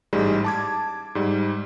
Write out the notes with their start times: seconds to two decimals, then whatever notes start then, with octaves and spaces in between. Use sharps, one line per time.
0.13 A1 G#2 G3 G#3
0.44 A5 D6 G#6
1.15 G#2 G3